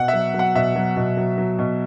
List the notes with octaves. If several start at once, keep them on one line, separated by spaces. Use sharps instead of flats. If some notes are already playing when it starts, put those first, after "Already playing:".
Already playing: B2 F#5
F#3 E5
F#3 F#5
B2 E5
F#3
B2
F#3
F#3
B2